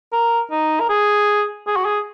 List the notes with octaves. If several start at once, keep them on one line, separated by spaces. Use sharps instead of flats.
A#4
D#4
A#4
G#4
G#4
F#4
G#4